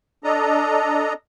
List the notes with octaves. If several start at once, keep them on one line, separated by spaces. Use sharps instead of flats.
D4 A4 D#5 A#5